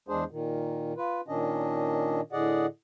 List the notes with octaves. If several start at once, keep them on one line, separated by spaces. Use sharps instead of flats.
E2 G#3 D4 G#4 C5
A#2 D#3
F4 B4
A#2 D#3 C#4 D4 D#5
A2 D3 G#4 D5 D#5 F#5